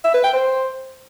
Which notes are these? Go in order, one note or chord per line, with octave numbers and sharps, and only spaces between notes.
E5
B4
G5
C5